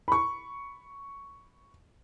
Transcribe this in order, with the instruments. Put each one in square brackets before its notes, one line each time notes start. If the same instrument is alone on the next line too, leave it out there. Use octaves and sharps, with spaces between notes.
[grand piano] B5 C#6